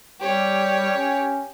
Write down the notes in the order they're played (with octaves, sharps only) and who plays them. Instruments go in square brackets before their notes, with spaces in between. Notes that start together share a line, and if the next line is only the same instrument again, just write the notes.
[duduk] G3 [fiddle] G4 C#5
[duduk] C#4